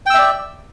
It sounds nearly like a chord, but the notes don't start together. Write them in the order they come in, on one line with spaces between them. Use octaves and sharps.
G5 E6 E5 D5